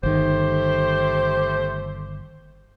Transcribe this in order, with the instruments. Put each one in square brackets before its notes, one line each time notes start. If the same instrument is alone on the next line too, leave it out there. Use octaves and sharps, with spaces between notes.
[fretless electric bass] G1 D#3 [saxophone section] A3 G4 C5